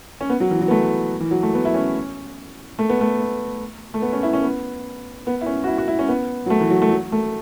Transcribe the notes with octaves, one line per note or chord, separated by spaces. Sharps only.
C#4
B3
F#3
E3
F#3
B3
A3
E3
F#3
A3
B3
E4
C#4
A3
B3
A3
B3
A3
B3
C#4
E4
C#4
B3
B3
E4
C#4
F#4
E4
F#4
E4
C#4
B3
F#3
A3
E3
F#3
A3
F#3
A3